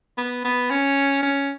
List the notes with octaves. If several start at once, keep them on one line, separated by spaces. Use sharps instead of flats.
B3
B3
C#4
C#4